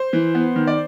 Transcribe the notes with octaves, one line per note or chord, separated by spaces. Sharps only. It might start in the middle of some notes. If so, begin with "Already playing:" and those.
Already playing: C5
E3
B3
D#3
D5